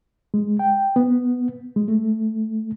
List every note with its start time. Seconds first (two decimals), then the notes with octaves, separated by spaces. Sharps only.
0.34 G#3
0.59 G5
0.96 B3
1.76 G#3
1.88 A3